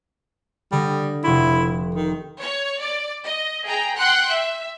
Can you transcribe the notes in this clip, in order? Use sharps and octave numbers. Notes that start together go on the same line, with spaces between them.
D3 G3 D#6 A#6
F1 E4 C6 C#6
D#3
C#5
D5
D#5
G#4 G5 A#5
F#5 G5 C6 F#6
E5